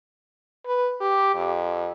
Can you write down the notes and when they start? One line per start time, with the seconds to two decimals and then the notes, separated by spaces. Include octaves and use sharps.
0.66 B4
1.01 G4
1.35 F2